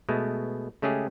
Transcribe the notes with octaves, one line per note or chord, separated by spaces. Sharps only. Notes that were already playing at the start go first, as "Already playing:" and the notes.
B2 G#3 A3
C#3 G#3 A3 C#4 G4 G#4